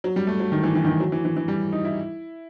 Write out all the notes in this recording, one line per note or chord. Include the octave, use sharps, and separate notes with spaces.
F#3
G3
A3
F#3
D#3
E3
E3
D#3
E3
F#3
E3
E3
E3
G3
D#4
E4